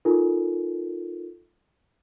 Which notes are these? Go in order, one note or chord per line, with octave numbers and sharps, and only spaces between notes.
D#4 F4 A4 A#4